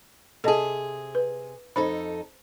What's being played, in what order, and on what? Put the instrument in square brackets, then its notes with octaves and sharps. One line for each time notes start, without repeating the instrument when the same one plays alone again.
[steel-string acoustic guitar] C3 G#4 [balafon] A4 D#5 A5
[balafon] B4
[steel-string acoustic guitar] F2 D#4 A4 [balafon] C5 B5